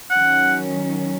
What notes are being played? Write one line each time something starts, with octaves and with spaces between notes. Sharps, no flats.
D#3 F#3 C#4 F#5